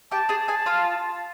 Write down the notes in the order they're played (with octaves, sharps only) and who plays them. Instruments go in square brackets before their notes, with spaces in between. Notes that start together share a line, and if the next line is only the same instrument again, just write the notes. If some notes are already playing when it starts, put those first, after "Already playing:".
[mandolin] G4 G5 [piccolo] A5
[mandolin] G#4 G#5
G#4 G#5
F4 F5